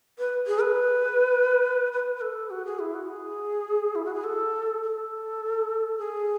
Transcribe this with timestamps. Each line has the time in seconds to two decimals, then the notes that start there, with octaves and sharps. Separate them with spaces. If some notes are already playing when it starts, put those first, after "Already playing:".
0.19 B4
0.47 G#4
0.61 B4
1.93 B4
2.15 B4
2.21 A4
2.50 F#4
2.65 G#4
2.79 E4
2.94 F#4
3.09 G#4
3.95 E4
4.05 F#4
4.14 G#4
4.24 A4
4.83 A4
5.98 G#4